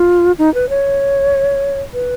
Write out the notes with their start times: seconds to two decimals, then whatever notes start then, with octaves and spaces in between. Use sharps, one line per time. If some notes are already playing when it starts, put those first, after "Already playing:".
Already playing: F4
0.38 D#4
0.54 B4
0.69 C#5
1.94 B4